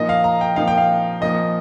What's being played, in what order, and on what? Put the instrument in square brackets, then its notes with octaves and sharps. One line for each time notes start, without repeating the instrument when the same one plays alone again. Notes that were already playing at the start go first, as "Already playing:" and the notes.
Already playing: [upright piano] A#2 F3 D#4 [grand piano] D#5
[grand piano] F5
A#5
G5
[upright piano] A#2 F3 D#4 [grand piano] F5
[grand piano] G5
F5
[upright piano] A#2 F3 D#4 [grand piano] D#5